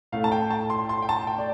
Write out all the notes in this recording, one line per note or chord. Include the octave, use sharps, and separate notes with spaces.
A2 A3 F5
A5
G5
A5
C6
C6
G5
A5
G5
D5